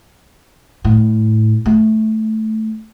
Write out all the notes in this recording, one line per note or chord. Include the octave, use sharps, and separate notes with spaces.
A2
A3